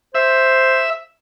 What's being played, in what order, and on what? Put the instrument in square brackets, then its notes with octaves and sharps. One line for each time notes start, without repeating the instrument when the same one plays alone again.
[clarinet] C5 [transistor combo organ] E5